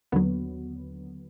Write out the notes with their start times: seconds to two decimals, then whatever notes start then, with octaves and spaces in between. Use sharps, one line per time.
0.12 D#2 D3 F#3 B3